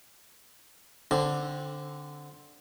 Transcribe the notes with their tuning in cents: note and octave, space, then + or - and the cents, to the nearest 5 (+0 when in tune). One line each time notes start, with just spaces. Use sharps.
D3 +0 C4 +5